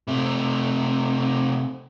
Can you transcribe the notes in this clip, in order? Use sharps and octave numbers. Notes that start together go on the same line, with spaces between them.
C3 A3